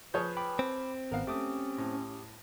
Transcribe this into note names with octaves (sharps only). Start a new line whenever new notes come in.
F3 G#4 B4 C#5 G6
G5 B5 D6
C4
G#1 B3 A#4 F5
A3 C#4 G4 D6 D#6
A2